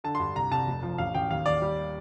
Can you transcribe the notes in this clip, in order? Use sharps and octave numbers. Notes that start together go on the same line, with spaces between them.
D3 A5
C6
G2
C2 A#5
C2 A5
F1
F3
A1 F5
A1 G5
D#2 F5
D#2 D5
G3